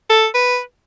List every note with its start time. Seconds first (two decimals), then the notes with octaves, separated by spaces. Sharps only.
0.10 A4
0.34 B4